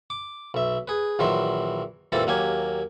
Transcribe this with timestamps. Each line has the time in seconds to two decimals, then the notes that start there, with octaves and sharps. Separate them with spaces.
0.10 D6
0.54 B1 E5
0.88 G#4 B4
1.19 A#1 D#3 E3 F#3 E5 C6
2.12 A#2 E3 G3 C4 A4 A5
2.27 D#2 F#3 A#3 G4 G#5